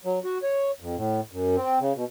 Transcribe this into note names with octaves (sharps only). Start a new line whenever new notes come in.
F#3
F#4
C#5
F2
A2
F#2
C4
C#3
B2